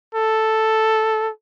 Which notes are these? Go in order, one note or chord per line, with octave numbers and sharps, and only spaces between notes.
A4